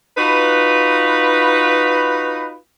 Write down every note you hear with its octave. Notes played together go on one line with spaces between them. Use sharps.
D#4 F4 F#4 B4